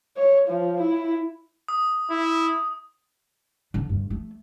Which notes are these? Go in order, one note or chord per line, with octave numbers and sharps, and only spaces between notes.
C#5
F3
E4
D#6
E4
D3
G2
A3